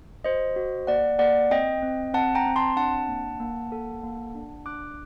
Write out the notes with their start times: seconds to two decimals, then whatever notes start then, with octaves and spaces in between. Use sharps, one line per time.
0.24 F#4 C5 D#5
0.56 F#4
0.87 A#3 D5 F#5
1.19 A#3 D5 F#5
1.50 C4 D#5 G5
1.82 C4
2.14 C4 F#5 A5
2.35 G5 A#5
2.46 C4
2.56 A5 C6
2.76 D4 F#5 A5
3.08 A#3
3.40 A#3
3.72 A4
4.03 A#3
4.35 D4
4.66 D4 D6 F#6